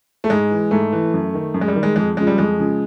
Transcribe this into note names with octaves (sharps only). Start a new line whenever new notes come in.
A3
G#2 G#3
E3
G#2 A3
E3
F#2
D#3
F#2
G#3
G3
D#3
G#3
F2 G#3
C#3 F3 G#3
G3
F2 G#3
C#3 F3